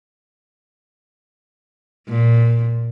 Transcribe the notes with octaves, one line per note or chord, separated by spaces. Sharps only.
A#2